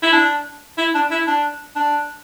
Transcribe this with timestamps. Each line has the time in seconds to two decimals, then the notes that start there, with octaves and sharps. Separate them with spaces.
0.03 E4
0.13 D4
0.78 E4
0.94 D4
1.11 E4
1.27 D4
1.76 D4